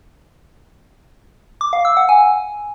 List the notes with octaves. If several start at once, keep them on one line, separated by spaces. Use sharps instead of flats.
D6
F5
E6
F#5
G#5